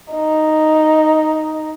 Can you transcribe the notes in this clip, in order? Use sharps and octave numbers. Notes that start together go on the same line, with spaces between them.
D#4